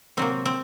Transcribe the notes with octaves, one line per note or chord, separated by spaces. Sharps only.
C3 F#3 A#3 C4
C4